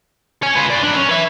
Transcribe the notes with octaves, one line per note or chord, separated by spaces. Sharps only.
C#5 G#5
F4 B4
B4 D5
F#3 D4
C#4
B4 E5